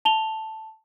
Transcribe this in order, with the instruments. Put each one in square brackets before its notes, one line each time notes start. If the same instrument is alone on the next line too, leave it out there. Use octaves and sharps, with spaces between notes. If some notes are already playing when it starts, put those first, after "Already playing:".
[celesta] A5 F7 G7